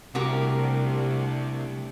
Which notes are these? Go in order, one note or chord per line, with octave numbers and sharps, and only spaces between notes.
C2 C3 A3 D4 F#4 G4 A#4